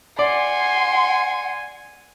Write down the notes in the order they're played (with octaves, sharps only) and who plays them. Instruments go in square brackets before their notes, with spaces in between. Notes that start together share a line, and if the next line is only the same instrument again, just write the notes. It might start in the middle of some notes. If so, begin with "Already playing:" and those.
[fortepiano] D5 [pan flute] F#5 [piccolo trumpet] G#5 [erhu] C6